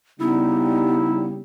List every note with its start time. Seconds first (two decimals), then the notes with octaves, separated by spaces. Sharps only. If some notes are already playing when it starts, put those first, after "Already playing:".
0.20 C#3 G3 B3 D#4 E4